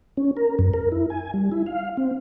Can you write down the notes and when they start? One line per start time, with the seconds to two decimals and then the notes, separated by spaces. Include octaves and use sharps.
0.17 C#4
0.37 A#4
0.59 F#2
0.74 A#4
0.92 E4
1.10 G#5
1.34 G3
1.52 E4
1.66 F5
1.97 C4